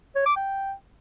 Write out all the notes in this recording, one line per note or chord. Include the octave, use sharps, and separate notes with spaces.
C#5
D6
G5